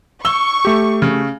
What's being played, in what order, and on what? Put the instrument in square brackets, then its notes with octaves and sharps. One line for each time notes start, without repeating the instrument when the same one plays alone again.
[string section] C#6 [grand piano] E6 G7
[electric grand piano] A3 G4
[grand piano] C#3